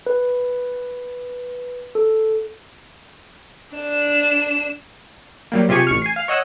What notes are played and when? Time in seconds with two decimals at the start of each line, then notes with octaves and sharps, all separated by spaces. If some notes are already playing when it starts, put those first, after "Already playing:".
0.06 B4
1.95 A4
3.77 D4 E7
5.52 F#3 G3 A#3
5.69 C3 F4 G4 G#4 G#5 C#6
5.87 A1 C#6 F6
6.02 G#5 C7
6.16 F5 F6
6.28 C#5 D#5 F#5 E6 F#6